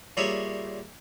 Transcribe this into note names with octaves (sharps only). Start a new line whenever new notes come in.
A#2 G3 G#4 C#5 E5